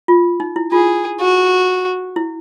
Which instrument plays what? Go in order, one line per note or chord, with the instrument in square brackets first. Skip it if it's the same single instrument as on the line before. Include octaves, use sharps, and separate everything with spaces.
[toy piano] F4
D#4
E4
[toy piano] F4 [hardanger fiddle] G#4
[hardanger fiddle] F#4
[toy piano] E4